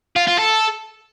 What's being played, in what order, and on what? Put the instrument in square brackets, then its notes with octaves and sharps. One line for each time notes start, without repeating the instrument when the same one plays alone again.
[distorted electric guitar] F4
F4
A4